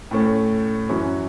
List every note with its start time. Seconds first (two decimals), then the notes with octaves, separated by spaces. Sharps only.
0.11 A2 A3 C#4
0.89 F#2 E3 C#4 F#4